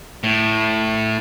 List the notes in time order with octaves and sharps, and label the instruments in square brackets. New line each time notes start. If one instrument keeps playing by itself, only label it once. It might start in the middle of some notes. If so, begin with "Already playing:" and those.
[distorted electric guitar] A2